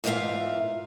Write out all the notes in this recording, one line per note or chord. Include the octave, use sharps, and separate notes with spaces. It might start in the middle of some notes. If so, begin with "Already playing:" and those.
E2 G#2 F4 A#4 E5 F5